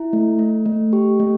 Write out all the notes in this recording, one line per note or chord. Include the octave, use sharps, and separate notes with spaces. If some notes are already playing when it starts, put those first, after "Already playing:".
Already playing: E4
A3
A3
A3
G4
A3